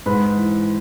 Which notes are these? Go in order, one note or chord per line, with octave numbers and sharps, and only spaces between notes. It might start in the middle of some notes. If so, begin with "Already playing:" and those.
G#2 B4 B5
E3